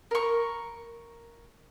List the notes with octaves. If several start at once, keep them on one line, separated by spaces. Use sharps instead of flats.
A#4 C#6